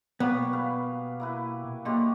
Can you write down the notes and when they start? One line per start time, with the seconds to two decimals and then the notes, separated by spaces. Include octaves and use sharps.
0.20 B2 F#3 G3 A#3 B3
0.53 B4 F5
1.20 A#3 E4 B4
1.85 D3 F#3 A#3 G4 D#5 C6